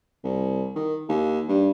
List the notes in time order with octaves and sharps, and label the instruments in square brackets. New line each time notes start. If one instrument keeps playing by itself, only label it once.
[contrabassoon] C2
D#3
D#2
G2